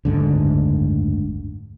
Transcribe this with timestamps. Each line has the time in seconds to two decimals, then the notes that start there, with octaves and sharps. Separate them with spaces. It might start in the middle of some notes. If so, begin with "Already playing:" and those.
0.05 F#1 D2 G#2 D3